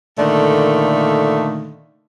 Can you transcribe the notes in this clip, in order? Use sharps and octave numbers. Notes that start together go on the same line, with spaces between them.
A#2 D3 D#3 A3